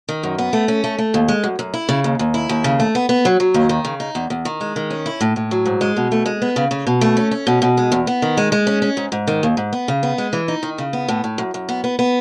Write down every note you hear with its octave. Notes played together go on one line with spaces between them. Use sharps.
D#3
F#2
B3
A3
C#4
A3
A3
D#2
G#3
F#2
F#2
E4
C#3
D#2
D#2
E4
D#2
C#3
A3
B3
B3
F#3
F#3
D#2
D#3
C#3
D#4
E2
E2
D#3
G#3
D#3
C#4
E4
A2
A2
F#3
G#2
G#3
B2
A3
G#3
B3
C#3
C#3
B2
A3
C#4
C#4
B2
B2
G#3
E2
B3
D#3
G#3
G#3
C#4
C#4
G#2
G#2
D#3
D#2
G#2
B3
C#3
B3
G#3
E3
D#4
D#3
C#3
B3
A2
A2
F#2
F#2
B3
B3
B3